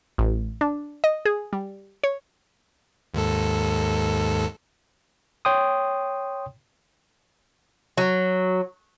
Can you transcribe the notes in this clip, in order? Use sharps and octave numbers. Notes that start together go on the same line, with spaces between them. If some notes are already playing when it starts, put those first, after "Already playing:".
A1
D4
D#5
G#4
G3
C#5
D#2 G#2 A4
C#5 G5 C6 D#6
F#3